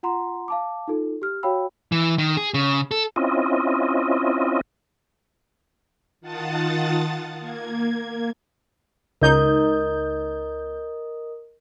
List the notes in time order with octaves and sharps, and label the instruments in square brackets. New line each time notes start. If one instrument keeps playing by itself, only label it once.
[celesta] F4 F#5 A#5 C6
F5 A5 D6
D#4 F4 A4
G4 F6
F#4 C#5 F5 G5 B5 E6
[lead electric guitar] E3
D#3
G#4
C#3
A4
[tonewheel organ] C4 C#4 E4 F4 D#5
[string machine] D#3 F4 F#5 A5 D#6 A6
A#3 G#6
[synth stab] C#2 D#4 G6 [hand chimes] A#4 D#5 D#6